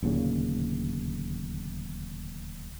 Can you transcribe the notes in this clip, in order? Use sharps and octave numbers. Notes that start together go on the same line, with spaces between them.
D1 D#2 A#2 C#3